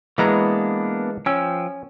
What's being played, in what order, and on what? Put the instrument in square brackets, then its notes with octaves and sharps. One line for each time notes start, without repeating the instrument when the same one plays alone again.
[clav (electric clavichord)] E3 G#3 A#5 [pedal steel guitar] A#3 B3 D4
[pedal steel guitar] F3 G5 E6 [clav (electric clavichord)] C#4